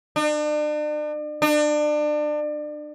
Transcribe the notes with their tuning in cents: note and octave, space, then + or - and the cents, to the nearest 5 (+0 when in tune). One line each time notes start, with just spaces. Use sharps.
D4 +40
D4 +30